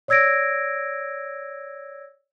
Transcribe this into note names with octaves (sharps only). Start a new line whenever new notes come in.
C#5 D5 E6 G#6 A#6 D7